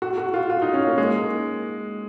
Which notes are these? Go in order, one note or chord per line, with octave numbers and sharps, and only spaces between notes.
F#4
F#4
F4
F4
D#4
C#4
A#3
G#3